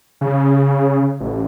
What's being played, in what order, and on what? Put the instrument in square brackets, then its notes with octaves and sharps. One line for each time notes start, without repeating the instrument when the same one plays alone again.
[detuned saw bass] C#3
A1